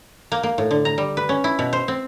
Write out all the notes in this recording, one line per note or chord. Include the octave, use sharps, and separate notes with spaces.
A#3
A#3
A2
D3
A#5
G3
B4
C#4
E4
B2
C5
C4